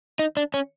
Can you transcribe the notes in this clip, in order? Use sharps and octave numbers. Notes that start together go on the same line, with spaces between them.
D#4
D4
C#4